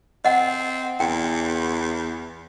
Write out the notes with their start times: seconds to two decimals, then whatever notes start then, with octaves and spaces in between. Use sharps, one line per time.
0.25 C4 D#5 F#5
1.00 E2 G5